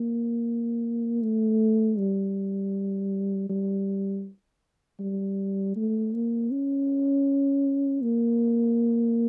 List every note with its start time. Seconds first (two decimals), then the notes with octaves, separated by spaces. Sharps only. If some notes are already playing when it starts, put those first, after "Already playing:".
Already playing: A#3
1.22 A3
1.98 G3
3.49 G3
4.99 G3
5.76 A3
6.13 A#3
6.51 C#4
8.02 A#3